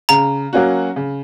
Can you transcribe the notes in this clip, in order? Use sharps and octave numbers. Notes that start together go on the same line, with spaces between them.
C#3 A#5
F#3 A#3 C#4 F#4
C#3